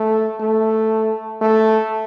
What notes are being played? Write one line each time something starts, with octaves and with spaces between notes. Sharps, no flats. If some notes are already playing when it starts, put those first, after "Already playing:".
Already playing: A3
A3
A3